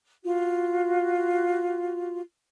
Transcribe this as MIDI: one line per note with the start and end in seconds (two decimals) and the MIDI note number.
0.24 2.20 65
0.24 2.20 66